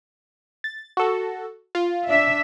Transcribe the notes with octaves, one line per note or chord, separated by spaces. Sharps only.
A6
F#4 A4
F4
D4 E5